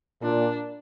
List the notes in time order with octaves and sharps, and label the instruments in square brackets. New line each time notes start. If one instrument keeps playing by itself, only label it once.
[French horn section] A#2 [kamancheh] D4